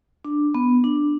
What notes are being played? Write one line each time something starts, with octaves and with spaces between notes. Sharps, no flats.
D4
B3
D4